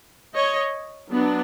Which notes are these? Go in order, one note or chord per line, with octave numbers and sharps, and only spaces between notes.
C#5 D#5
F#3 B3 D4